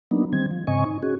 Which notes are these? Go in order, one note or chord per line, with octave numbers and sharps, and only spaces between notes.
F#3 A#3 B3 D4 D#4
D#3 G3 C4 G#6
F3
G#2 C#3 C4 D#5 G#5 C#6
D#4
C#4 F#4 G#4